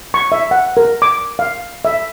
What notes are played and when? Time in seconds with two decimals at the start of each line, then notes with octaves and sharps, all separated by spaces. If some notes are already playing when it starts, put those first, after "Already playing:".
0.14 C#6
0.32 E5
0.51 F#5
0.77 A#4
1.02 D6
1.39 F5
1.85 E5